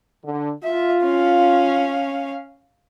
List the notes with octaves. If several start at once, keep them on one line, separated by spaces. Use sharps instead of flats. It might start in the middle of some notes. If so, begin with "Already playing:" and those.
D3
F4 E5
C#4 F5